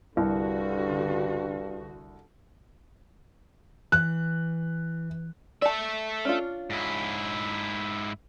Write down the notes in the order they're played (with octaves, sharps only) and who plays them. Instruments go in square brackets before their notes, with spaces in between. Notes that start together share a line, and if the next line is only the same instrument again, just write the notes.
[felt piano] C2 [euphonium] G2 [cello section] D3 F#4
[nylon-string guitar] E3 [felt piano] F#6
[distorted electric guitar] A4 E5 [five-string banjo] D5 A5
[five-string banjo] C#4 D4 F4
[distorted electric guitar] G#2 E4